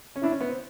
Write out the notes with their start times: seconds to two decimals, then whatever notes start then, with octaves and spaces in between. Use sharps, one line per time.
0.16 C#4
0.23 D4 E4
0.32 C#4
0.41 B3
0.50 C4